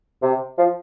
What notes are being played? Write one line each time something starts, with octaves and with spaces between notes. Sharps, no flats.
C3
F3